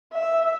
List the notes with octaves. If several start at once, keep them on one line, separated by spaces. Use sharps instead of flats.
E5